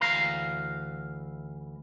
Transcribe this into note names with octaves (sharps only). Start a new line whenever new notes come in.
D2 E3 F5 A#5